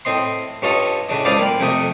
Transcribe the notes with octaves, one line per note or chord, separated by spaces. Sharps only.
A2 C4 D#5 C6
G2 C#4 F4 A4 D#5 A#5
A2 C#3 D4 D#5
C#2 E4 C5 D5 F5 D#6
G3 A#3 F4
F2 C3 A3 D#5 G5 D#6